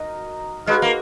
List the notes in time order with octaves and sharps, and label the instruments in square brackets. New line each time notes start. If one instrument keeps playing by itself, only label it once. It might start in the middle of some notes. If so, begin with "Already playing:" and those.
Already playing: [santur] D#4 F#4 A#4 D#5
[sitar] G#3 [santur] D#4 F#4 B4 F5
[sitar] A#3